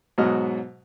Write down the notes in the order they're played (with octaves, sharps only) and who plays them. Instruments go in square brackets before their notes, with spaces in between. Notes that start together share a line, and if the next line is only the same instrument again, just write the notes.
[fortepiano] G#2 B2 F#3 F#4 D#5 F6